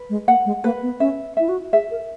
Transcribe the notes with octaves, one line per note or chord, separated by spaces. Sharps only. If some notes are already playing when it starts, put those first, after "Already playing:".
Already playing: B4
G#3
A#3 F#5
G#3
A#3 B4
B3
C#4 E5
E4 E5
F#4
G#4 E5
A#4